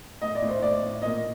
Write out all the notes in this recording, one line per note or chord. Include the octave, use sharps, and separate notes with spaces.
A2 D#5
D5
A2
C5
A2 D5
A2
A#2 D#5